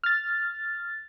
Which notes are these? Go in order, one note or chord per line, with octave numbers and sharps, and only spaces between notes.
F6 A6